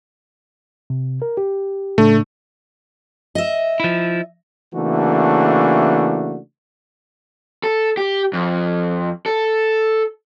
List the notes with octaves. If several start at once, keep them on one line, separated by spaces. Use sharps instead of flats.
C3
A#4
G4
A2 C#3 A3 D4
D#5 E5
F3 E4
C#3 E3 A3 A#3 D4 F#4
A4
G4
F2
A4